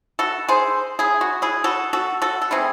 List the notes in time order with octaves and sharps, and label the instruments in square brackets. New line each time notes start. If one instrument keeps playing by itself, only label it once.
[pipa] F#4 A4
G#4 C5
E4 G#4
F#4
E4 G#4
F#4 A4
F#4 A4
F#4 A4
A4
E3 A3 C4 E4 G#4